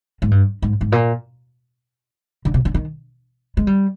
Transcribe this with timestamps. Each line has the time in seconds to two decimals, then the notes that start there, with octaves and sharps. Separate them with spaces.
0.22 G#2
0.31 G2
0.62 G#2
0.81 G#2
0.92 A#2
2.45 D3
2.54 C3
2.65 D3
2.74 D#3
3.57 G#3
3.67 G3